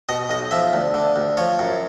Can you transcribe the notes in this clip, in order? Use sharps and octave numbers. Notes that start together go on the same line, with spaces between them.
B2 D#5
B1 D#5
F3 E5
D2
D3
D2
F3 C#5
F#2